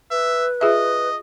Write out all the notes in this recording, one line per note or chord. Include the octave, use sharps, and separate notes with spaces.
B4 E5
F4 G#4 D#5 E5